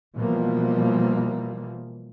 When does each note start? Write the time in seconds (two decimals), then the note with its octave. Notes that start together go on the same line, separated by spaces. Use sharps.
0.15 B2 E3 F3 G3 A#3